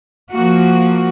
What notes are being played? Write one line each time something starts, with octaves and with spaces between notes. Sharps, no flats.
F3 A#3 F#4